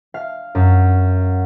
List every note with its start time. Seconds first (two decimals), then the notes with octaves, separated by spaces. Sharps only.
0.14 F5
0.55 F#2